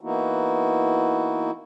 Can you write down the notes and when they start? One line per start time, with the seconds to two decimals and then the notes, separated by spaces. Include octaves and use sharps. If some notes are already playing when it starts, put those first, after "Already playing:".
0.01 E3 A#3 B3 D#4 E4 F#4